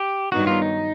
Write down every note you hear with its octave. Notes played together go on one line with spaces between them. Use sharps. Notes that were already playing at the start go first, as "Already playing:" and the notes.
Already playing: G4
G2 D#3 F#3 B3 D#4 F#4
F4
D#4